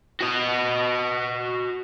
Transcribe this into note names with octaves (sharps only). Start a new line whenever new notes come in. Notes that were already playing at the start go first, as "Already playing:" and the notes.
F#4 D#5